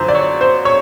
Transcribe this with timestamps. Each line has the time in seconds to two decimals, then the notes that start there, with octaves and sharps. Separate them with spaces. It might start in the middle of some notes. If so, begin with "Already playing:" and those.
Already playing: F#2 D3 F3 C5
0.08 D5
0.15 C#5
0.41 C5
0.65 C#5